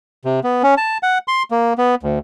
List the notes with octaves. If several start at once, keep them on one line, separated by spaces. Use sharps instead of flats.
C3
B3
C#4
A5
F#5
C6
A#3
B3
D2